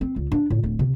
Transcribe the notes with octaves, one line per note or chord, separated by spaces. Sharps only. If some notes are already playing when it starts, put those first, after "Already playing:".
C4
C#2
D4
A2
D1
C3